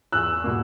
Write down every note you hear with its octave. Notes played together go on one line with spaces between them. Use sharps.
E2 E6 F#6
B2 G3 A#3